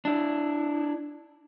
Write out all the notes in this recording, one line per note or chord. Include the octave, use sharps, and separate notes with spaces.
D4 E4